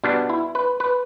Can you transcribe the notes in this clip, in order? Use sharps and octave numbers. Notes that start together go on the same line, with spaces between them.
B2 G3 B3 D4
E4
B4
B4